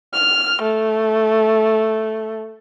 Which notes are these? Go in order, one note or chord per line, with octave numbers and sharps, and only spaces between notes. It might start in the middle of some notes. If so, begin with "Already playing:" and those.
F6
A3